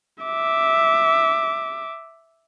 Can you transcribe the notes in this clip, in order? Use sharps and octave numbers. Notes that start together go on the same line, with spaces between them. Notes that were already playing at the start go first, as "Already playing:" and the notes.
E5 D6